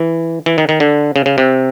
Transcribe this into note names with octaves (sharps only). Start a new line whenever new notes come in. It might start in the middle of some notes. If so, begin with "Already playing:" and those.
Already playing: E3
E3
D#3
D#3
D3
C#3
C#3
C3